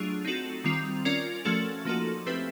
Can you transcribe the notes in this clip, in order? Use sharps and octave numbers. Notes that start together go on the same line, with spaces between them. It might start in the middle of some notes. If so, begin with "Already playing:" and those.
Already playing: F#3 A3 D4 F4 G#4
C4 D#4 F#4 A4
D#3 G3 C4 F4
C#4 F4 A#4 D5
F3 A3 C#4 F#4 A4
F3 A#3 D#4 F#4 A4
A3 C4 E4 G4 B4